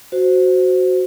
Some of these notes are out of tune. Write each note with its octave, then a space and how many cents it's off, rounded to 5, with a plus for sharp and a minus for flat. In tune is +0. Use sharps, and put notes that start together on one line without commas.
F#4 +0 C5 -10